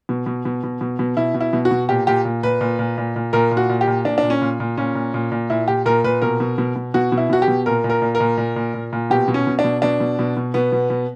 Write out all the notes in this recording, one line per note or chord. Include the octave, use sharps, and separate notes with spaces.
B2
B2
B2
B2
B2
B2
B2 E4
B2
E4
B2
F#4
B2
A#2 G4
A#2 G4
A#2
A#2 B4
A#2
A#2
A#2
A#2
A#2 A#4
A#2
F#4
A#2
G4
A#2
A#2 D4
D4
A#2
C#4
A#2
A#2
A#2 C#4
A#2
A#2
A#2
A#2 E4
A#2 G4
A#2 A#4
A#2 B4
B2 A#4
B2
B2
B2
B2 F#4
B2
E4
B2 F#4
G4
B2
A#2 A#4
A#2
A#4
A#2
A#4
A#2
A#2
A#2
A#2
A#2
B2 G4
B2
C#4
B2
D4
B2
B2 D4
B2
B2
B2
B2 B3
B2
B2